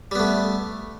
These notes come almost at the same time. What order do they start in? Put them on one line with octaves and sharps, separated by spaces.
G3 B3 A3